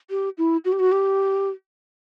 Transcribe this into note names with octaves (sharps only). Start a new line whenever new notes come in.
G4
E4
F#4
G4
F#4
G4